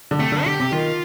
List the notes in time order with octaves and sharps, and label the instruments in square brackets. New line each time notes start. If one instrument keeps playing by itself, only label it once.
[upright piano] D3
[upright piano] C3 [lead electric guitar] A3
[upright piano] D3
[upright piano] D3 [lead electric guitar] G4
[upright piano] C3
[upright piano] D#3 [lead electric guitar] F4